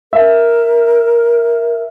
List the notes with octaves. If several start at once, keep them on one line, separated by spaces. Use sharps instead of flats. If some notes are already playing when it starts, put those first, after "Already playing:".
A#4 E5